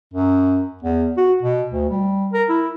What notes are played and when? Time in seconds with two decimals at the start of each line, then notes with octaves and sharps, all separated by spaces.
0.14 F#2
0.83 E2
1.17 F#4
1.42 B2
1.70 D2
1.90 G3
2.33 A#4
2.49 E4